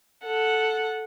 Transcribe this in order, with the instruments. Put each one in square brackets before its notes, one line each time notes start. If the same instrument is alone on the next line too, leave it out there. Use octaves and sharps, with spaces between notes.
[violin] A4 F#5